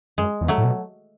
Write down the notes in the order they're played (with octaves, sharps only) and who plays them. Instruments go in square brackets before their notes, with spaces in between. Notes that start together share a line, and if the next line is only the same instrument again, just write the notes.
[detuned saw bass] F#2 [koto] G#3
[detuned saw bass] E2
[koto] F#3 A3
[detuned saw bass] A2
B2